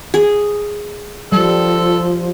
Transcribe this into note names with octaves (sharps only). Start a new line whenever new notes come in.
G#4
F3 G3 A4